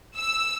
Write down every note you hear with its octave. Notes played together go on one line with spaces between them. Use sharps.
E6